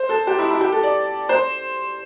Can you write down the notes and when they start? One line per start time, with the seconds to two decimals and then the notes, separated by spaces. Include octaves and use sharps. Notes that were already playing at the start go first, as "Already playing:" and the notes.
Already playing: C5
0.09 A4
0.27 G4
0.39 E4
0.50 E4
0.61 G4
0.72 A4
0.83 D5
1.29 C5